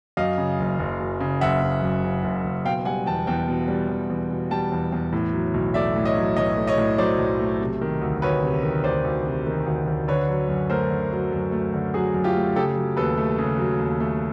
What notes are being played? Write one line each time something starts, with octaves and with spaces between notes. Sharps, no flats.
F#2 D#5 F5
C#3
F#1
F#1
F#2
C#3
F#1 E5 F#5
F#1
F#2
C#3
F#1
F#1
B2 F5 G5
G3 F#5 G#5
E2 G5 A5
E2 G5 A5
B2
G3
E2
E2
B2
G3 G5 A5
E2
E2
A2
F#3
B1
A3 D5 E5
A2
C#5 D#5
F#3
B1 C#5 D#5
A3
C#5 D#5
A2
F#3 C5 D5
B1
A3
C3
D#3
D2
D2 B4 C#5
C3
D#3
D2 C5 D5
D2
C3
D#3
D2
D2
D3 B4 C#5
F#3
F#2
A3 A#4 C5
D3
F#3
F#2
A3
D3
F#3 F#4 G#4
F#2
F4 G4
A3
C#3 G4 A4
F#3
D#2 A4 B4
A3
C#3
F#3
D#2
A3